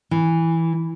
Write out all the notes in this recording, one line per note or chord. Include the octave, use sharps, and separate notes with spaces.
E3